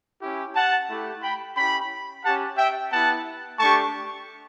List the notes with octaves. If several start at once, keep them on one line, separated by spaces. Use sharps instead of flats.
C#4 E4 G4
F#5 A5
A3 E4 G4
G5 B5
C#4 E4 G4 G5 B5
C#4 G4 F#5 A5
E5 G5
B3 E4 G4 F#5 A5
A3 D4 G4 A5 C#6